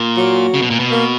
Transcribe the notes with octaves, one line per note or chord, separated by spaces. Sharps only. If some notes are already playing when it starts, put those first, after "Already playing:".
Already playing: A#2
F#3
C#3
B2
A#2
B2
A#3